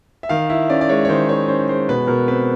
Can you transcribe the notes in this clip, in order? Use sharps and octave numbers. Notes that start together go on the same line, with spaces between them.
E5
D#3 F5
E4 E5
C#4 D5
D5
G#3 C#5
C#5
D#3 C5
E4 C#5
C#4 C5
G#3 C5
B2 B4
B2 A#4
C4 B4